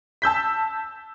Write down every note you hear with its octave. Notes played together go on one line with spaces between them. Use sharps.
A5 E6 G6 B6